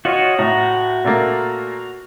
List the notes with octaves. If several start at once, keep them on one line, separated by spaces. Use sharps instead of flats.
F4 F#4 C#5 D#5
A2 F#4 A#5
A#2 A3 A#3